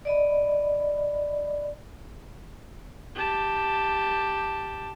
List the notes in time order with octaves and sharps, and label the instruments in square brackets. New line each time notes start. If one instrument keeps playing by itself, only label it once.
[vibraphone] D5 D#5 B5
[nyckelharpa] G4 A5